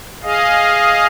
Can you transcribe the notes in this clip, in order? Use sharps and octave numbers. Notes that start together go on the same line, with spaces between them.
G#4 D#5 F5